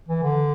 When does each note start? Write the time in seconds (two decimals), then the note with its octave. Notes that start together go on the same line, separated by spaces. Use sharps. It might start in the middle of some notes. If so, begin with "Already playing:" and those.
0.08 E3
0.23 D3